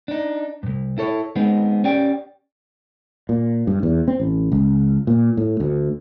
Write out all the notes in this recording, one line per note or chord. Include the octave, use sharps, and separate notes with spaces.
D4 D#4
C2 G2
E4 A4 C#5
G#3 B3 C4 D#4
C#4 G4 D5 G5
A#2
G2
E2
C4
A1
C#2
A#2
A2
D2